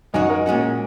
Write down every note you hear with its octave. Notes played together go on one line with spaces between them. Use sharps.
F#2 F#3 D#4 F#4 D#5 G#5
A#4 D#5
A#2 G#3 C#4 F#4